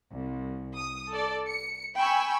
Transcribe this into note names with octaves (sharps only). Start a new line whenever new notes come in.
C2
D#6
A4 D5
C#7
G5 G#5 B5 C#6 E6